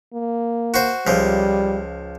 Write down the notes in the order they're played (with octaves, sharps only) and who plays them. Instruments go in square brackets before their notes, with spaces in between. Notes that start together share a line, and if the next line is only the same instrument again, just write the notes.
[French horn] A#3
[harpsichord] F#4 C5
[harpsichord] C#2 F3 [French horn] G3